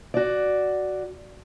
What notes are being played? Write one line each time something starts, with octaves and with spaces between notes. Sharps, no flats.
F#4 D5